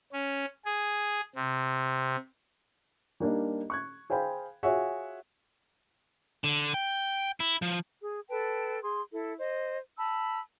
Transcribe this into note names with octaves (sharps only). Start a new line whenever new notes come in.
C#4
G#4
C3
G3 A#3 D4 D#4
C#6 F#6 G#6
G#4 C5 F5 G5 B5
F4 F#4 G#4 C#5 E5 F#5
D3
G5
E4
F3
G#4
A4 B4 G5 A5
G#4 C6
E4 A4
C5 D#5
A5 B5 E6